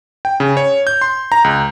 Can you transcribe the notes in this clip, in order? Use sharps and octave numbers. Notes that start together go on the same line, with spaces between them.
G5
C#3
C#5
G6
C6
A#5
C#2